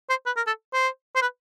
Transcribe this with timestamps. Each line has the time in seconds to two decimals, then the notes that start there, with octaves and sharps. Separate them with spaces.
0.10 C5
0.26 B4
0.37 A#4
0.47 A4
0.73 C5
1.16 C5
1.22 B4